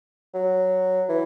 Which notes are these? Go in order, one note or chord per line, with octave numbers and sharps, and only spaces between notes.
F#3
E3